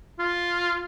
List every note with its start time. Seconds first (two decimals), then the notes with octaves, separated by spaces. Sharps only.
0.19 F4